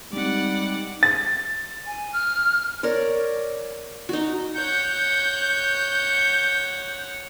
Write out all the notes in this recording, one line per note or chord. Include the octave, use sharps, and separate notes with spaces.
G3 G#3 C4 D#4 D5 F#5
A6
G#5
F6
A#4 C#5 D5
D#4 F#4
C#5 F#5 G6